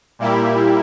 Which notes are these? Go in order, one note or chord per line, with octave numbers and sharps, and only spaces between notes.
A#2 G3 A#3 E4 G4